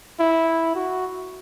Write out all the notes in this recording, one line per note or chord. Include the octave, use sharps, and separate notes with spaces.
E4
F#4